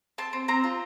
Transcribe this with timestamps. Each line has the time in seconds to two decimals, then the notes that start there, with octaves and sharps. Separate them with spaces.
0.18 C4 A5
0.33 C4
0.48 C4 A#5
0.64 F4